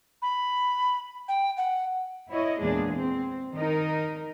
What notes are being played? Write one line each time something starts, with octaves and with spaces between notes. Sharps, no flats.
B5
G5
F#5
E4 C#5 D#5
E2 A#2 G#3 D4 G#4
C4
D#3 D#4 A#4